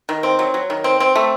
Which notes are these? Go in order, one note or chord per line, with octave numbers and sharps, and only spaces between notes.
D#3
C4
F#3
F#3
D#3
C4
C4
A3